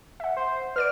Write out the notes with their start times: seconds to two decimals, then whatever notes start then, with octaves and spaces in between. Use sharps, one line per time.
0.20 E5 F#5
0.37 C5
0.76 B4 D5 F6 D7